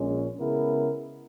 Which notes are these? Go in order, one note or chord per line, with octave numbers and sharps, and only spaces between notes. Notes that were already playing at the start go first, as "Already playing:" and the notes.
Already playing: A#1 A#2 G#3 C#4
C#3 G#3 B3 E4 A#4